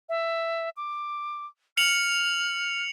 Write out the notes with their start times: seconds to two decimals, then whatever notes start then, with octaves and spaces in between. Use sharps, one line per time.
0.09 E5
0.77 D6
1.77 F6 C#7 F7 F#7